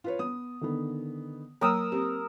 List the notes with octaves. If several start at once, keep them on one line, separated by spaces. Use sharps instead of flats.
F4 B4 C#5
B3 D#6
D3 D#3 B3
F#3 A#3 A#4 C#5 D#6 E6
C4 G4